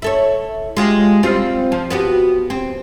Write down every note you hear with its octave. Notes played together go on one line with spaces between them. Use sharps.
E4 A4 C#5
G#3 F4 G4
G3 C4 F4
F3
B3 F#4 G4
C4